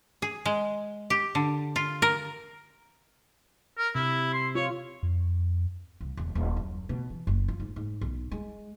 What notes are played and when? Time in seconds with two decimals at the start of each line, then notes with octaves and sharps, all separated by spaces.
0.22 G#4
0.46 G#3
1.10 G4
1.35 D3
1.76 F4
2.02 A#4
3.78 A#4
3.95 C3 E4
4.33 C6
4.55 F4 C#5
5.03 F2
6.01 C2
6.17 E1
6.35 D#1
6.57 F#2
6.89 B2
7.10 E3
7.27 F#1
7.48 F4
7.60 G#2
7.76 G#2
8.01 B1
8.32 G#3